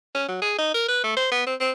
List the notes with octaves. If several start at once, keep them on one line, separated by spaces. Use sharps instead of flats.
C#4
F#3
G#4
D#4
A#4
B4
A3
C5
B3
C4
C4